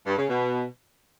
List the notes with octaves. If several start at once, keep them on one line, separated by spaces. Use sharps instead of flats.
G2
C#3
B2